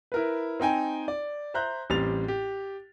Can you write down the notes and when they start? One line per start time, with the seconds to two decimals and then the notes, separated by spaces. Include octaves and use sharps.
0.12 E4 A#4 B4
0.60 C4 D#4 G5 G#5 A#5
1.08 D5
1.54 C5 E5 A#5 F#6 G6
1.90 A1 G3 C4 A6 F7
2.28 G4